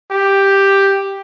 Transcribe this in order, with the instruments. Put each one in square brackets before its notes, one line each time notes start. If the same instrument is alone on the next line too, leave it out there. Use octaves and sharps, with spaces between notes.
[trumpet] G4